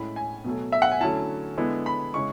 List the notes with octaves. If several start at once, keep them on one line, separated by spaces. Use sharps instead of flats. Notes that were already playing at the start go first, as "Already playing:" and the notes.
Already playing: A2 G#3 C#4 E4 B5
G#5
B2 F#3 A3
E5
F#5
G#5
D3 F#3 A3 C#4 E4 A5
D3 G#3 B3 E4
B5
C#3 G#3 C#4 E4 C#6